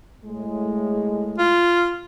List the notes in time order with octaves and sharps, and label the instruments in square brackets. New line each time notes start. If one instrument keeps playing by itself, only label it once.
[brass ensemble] A2 G#3
[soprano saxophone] F4